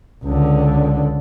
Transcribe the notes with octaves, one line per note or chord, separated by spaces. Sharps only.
C#2 D3